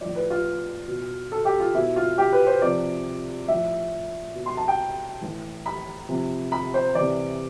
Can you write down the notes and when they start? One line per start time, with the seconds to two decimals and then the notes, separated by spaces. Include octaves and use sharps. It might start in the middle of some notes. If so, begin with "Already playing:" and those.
0.01 A2 F3 D5
0.16 B4
0.30 F4
0.87 B2
1.32 A4
1.45 G4
1.60 F4
1.74 B2 E4
1.96 F4
2.18 G4
2.33 B4
2.47 C5
2.62 C3 F3 D5
3.48 A2 F3 E5
4.34 B2
4.46 C6
4.57 A5
4.68 G5
5.21 A2 E3
5.66 B5
6.09 C3 F3
6.52 B5
6.74 C5
6.95 C3 E3 D5